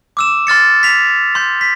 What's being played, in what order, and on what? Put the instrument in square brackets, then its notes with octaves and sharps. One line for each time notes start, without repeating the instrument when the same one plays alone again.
[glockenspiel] D6 E6 E7
C6 F6 A6 C#7
B6 F7
C6 G6
B6